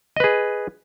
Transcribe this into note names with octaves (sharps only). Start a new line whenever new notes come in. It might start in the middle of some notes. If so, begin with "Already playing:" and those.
G#4 B4 D#5